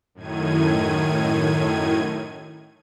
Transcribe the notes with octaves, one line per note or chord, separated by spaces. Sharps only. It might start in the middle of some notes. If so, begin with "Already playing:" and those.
F#2 A2 D#3 G#6 D#7